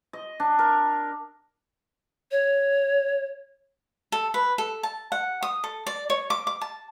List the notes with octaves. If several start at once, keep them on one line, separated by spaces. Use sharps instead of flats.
D#5
D4
A#4
C#5
A4
B4
A4
A5
F#5
D#6
A4
D5
C#5
D6
D6
A5